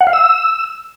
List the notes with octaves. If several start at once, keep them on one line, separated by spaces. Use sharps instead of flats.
F#5
F5
E6